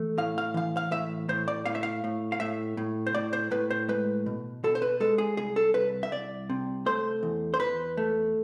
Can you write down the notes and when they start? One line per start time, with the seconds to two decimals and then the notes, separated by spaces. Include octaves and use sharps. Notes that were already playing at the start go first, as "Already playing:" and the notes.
Already playing: E3 A3
0.18 A2 F5
0.38 F5
0.54 E3 F5
0.77 F5
0.91 A2 E5
1.29 A2 C5
1.48 D5
1.66 A2 F5
1.75 E5
1.83 F5
2.04 A2
2.32 F5
2.40 A2 E5
2.77 A2
3.07 C5
3.15 A2 D5
3.33 C5
3.51 A2 B4
3.71 C5
3.88 G#3 B4
4.26 B2
4.64 B2 A4
4.75 C5
4.82 B4
5.00 G#3 A4
5.18 G#4
5.37 C2 G#4
5.56 A4
5.74 C2 B4
6.03 E5
6.12 C2 D5
6.50 C3
6.86 A3 C5
7.23 E2
7.54 C5
7.60 E2 B4
7.97 A3